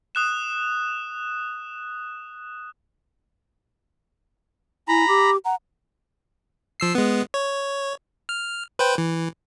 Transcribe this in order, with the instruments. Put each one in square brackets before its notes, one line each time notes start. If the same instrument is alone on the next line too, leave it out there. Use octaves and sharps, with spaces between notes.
[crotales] D#6 F#6 E7
[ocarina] E4 [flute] G#5 [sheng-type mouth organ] A#5 B5
[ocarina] G4 [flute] D6
[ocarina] F#5 [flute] A#5
[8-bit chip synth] F3 E6 C7
G#3 B3
C#5
F6
B4 C5 G5
E3